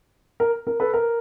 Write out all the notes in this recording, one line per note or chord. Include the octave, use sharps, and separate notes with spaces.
A#4
A#4
A4 B4
A#4